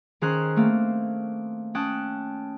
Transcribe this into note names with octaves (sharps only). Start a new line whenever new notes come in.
D#3 C#4 G#4 C5 A#5 F#6
A3 A#3 C4
C#4 G5 A5 D#6 F#6